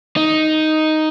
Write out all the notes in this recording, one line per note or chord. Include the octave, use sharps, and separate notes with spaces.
D#4